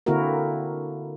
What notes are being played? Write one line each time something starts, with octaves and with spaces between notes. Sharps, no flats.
D3 A#3 C4 E4 F#4 A#4